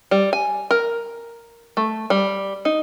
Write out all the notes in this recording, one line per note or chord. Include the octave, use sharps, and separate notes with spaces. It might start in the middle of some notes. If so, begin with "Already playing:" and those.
G3
G#5
A#4
A3
G3
D#4